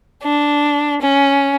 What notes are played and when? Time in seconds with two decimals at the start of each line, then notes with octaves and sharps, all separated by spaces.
0.22 D4
1.01 C#4